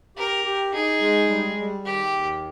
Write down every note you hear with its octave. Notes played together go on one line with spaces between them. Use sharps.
G4 A#4
G4
D#4 G#4
G#3
G3
G3
D#3 G4
D#2